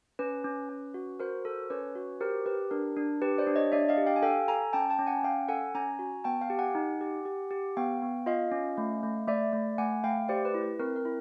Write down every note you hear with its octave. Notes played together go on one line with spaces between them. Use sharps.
C#4 B4
C#4
C#4
F#4
F#4 A#4 C5
A4
C#4 B4 C#5
F#4
G4 A#4 C5
G4 B4
D4 A#4
D4
G4 B4
C5 D5
D4
C#5 D#5
D4 D5 E5
D#5 F5
G4
F5 G5
G#5
A4 F5 G5
A4 G#5 A#5
C#4 G5 A5
G5 A5
C#4
F#5 G#5
C#4 F5 G5
A4 F#5 G#5
C#4 G#5 A#5
F#4
B3 G5 A5
F5 G5
G4
F#5 G#5
D#4
G4
G4
G4
B3 F5 G5
B3
F4 D#5 F5
C#4
A3
A3
A3 D5 E5
A3
A3 F#5 G#5
A3 F5 G5
G4 C5 D5
B4
E4
B4
C4 A#4
A#4
E4